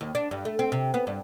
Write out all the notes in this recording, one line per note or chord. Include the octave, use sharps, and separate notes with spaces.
D#2
D4
G2
A3
C4
C3
B3
G2